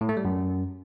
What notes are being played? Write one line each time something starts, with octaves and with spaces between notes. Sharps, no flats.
A2
A3
G3
F#2